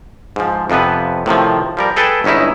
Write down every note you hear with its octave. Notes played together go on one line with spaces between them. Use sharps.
G#2 F3
F2 C3 F3 B3 B4
A2 C3 D#3 F3
F3 G3 A#4
G#4 A4 B4 G5 A5
G1 G#2 C#4 D#4 E4